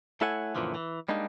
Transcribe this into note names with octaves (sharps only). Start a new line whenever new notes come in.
A3 E4 A4 C#5 F#5 G#5
F#2 A#2 D3 E3 F3
E3
G3 G#3 A#3 D4 D#4